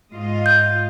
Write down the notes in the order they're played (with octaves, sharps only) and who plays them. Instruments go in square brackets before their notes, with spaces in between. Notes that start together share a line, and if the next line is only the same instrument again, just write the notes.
[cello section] G#2 F4 D#5
[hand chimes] G6